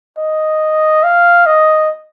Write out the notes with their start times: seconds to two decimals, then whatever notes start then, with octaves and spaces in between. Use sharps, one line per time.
0.18 D#5
1.04 F5
1.46 D#5